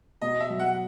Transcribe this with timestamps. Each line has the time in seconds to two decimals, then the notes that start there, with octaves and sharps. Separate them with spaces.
0.21 B2 D#5
0.40 E5
0.50 F#3
0.59 F#5